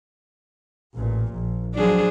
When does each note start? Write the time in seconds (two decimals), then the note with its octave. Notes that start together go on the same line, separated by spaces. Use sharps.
0.95 A1 A#2
1.33 A#1
1.75 F3 F#3 D4 G#4